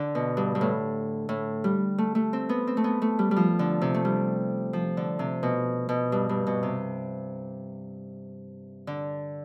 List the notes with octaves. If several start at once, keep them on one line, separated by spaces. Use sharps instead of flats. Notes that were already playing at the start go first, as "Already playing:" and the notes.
Already playing: D3
B2
G2
G2
A2
A2
G3
A3
A3
C4
B3
C4
A3
B3
A3
G3
G3
F3
D3
C3
A3
G3
F3
D3
C3
B2
B2
G2
G2
B2
C3
D3